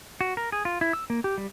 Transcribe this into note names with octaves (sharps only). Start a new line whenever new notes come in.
F#4
A#4
G#4
F4
E4
E6
A#3
G4
G3